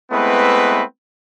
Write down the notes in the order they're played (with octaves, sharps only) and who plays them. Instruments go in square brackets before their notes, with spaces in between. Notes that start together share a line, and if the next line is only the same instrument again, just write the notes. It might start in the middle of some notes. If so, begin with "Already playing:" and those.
[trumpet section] G#3 A3 B3 C4 E4 B4